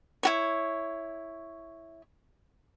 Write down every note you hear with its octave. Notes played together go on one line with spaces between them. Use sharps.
E4 F#4 C#5